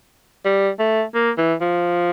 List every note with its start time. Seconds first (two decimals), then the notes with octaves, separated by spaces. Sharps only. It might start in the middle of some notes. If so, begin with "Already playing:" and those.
0.45 G3
0.79 A3
1.15 A#3
1.38 E3
1.61 F3